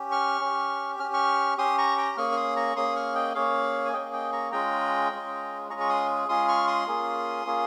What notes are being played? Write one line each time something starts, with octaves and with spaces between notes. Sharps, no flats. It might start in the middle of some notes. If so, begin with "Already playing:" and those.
Already playing: C#4 G4
C#6 F6
C#4 G4
C#4 G4 F6
C#6 F6
C#4 G4 C6 D#6
A#5 C#6
G5 A#5
A#3 C#4 G#4 C#6 F6
F6
C6 D#6
A#5 C#6
A#3 C#4 G#4 C6 D#6
C#6 F6
D#5 G5
A#3 C#4 G#4 C#5 F5
G#5
A#3 C#4 G#4 D#5 G5
D#5 G5
A#5 C#6
G#3 C#4 F4 G#4 G5 A#5
G#3 C#4 F4 G#4
G#3 C#4 F4 G#4 A#5 C#6
C#6
C6 D#6
G#3 C#4 F4 G#4 C6 D#6
C#6 F6
C6 D#6
A#3 C#4 F4 G#4
A#3 C#4 F4 G#4